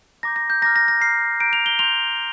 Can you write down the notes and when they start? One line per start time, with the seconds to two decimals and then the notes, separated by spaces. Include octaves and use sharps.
0.23 A#5 D6 G6 A#6
0.36 A#6
0.50 G6
0.62 A#5 D6 F6 A#6
0.76 A#6
0.88 A#6
1.01 A#5 F6 C7
1.40 A#5 G6 D7
1.53 F7
1.66 G7
1.79 C6 G6 F7